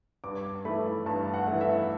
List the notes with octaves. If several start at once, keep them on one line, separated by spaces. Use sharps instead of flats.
G2 D6
E3 A3 B5
G2 A5
F#5
E3 A3
E5